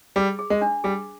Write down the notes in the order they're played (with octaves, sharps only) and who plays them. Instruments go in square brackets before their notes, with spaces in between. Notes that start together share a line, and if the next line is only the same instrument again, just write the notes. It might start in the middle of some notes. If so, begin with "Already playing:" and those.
[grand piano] G3 [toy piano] G#4
[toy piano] G#4
[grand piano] G#3
[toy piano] D4
[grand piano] G3 [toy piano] G#4